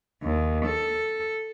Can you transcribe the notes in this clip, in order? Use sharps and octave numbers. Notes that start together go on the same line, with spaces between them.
D#2
A4